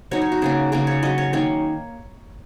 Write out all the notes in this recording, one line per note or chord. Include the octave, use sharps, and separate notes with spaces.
F#3 D#4 C#5
C#5
F#4
C#3 A#3 C#4 G#4
C#3 A#3 C#4 A#4
C#5
F#3 C#4 D#5
C#5
D#3 A#3 C#4 C#5